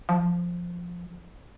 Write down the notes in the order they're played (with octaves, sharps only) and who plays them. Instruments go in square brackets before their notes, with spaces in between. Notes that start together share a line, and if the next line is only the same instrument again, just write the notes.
[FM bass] F3